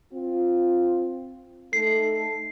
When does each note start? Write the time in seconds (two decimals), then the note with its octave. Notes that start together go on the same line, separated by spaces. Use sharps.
0.13 C4 F4
1.73 A3 D#4 A4 C7